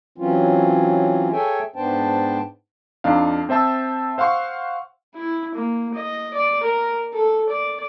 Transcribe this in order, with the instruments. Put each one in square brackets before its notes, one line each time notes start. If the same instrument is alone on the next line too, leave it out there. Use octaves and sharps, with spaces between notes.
[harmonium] E3 F#3 C4 C#4 F4
G#4 A4 C#5 E5 G5 G#5
G#2 B3 D4 C5 G5 A5
[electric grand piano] F2 D4 D#4 F5
C4 C5 E5 A5 E6
C5 F5 F#5 C6 C#6
[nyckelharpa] E4
A#3
D#5
D5
A#4
A4
D5